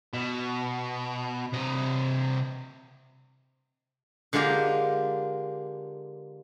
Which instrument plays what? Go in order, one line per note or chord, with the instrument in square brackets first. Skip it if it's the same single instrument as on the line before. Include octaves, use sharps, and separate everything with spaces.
[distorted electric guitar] B2
C3 D#5
[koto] D3 G#3 A#3 F4 G4 A#4